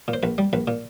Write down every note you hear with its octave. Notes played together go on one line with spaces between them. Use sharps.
A#2
C5
A#1 B4
G3
A#1 B4
A#2